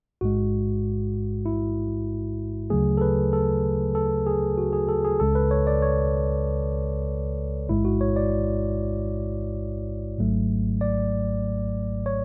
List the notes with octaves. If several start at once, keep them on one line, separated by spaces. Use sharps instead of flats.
A1 G#2 G#3 F#4
E4
D2 C#3 F#3 A3 G#4
A4
B4
A4
A4
G#4
F#4
G#4
A4
G#4
C#2 C#3 G#3 A4
B4
C#5
D5
C#5
A1 G#2 G#3 E4
F#4
C#5
D5
G#1 G#2 F#3 A3
D5
C#5